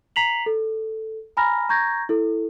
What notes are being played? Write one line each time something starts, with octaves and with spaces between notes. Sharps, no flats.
A#5 B6 C7 F7 F#7
A4
G#5 A#5 B5 F6 A#6
A#5 C#6 G6 G#6 A#6
E4 A4